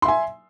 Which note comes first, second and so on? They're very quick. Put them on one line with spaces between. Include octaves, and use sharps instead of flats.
C6 E5 G#5